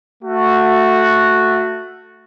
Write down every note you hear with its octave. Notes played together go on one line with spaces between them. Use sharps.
A3 F#4